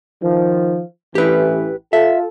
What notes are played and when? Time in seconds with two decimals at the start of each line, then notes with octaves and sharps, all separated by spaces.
0.23 D#3 F3
1.15 A1 E3 G4 B4
1.93 F4 A4 E5